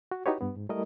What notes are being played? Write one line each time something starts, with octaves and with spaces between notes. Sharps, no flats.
F#4
D#4 E4 F#4 G4 B4 C#5
G2 B3
G#2
G3 A3 E4 A#4 D#5